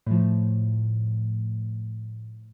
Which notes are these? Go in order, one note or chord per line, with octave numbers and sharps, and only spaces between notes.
A2 F3